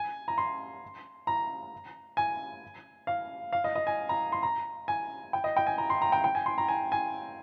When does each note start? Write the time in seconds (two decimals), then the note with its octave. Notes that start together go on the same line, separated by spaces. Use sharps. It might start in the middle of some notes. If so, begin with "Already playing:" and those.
Already playing: G#5
0.28 A#5
0.38 C6
1.27 A#5
2.17 G#5
3.07 F5
3.53 F5
3.64 D#5
3.75 D#5
3.87 G#5
4.09 A#5
4.32 C6
4.43 A#5
4.88 G#5
5.33 G5
5.44 D#5
5.57 G5
5.67 G#5
5.78 A#5
5.90 C6
6.02 A#5
6.12 G5
6.24 G5
6.35 G#5
6.46 C6
6.58 A#5
6.68 G#5
6.92 G#5